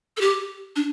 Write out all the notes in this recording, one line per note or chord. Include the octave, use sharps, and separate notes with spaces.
A4
G4
D4